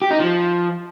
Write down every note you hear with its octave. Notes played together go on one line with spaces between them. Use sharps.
G4
D#4
F3